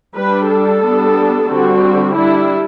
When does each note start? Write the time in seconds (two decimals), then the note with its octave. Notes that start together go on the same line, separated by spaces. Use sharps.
0.16 G3 D4 B4
0.49 A4
0.83 G3 B3 D4
1.49 D3 G3 C4 F#4
2.16 G3 D4 E4